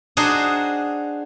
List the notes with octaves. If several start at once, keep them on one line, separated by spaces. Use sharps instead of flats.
D4 F#4 G#4 C5 D#5 A#5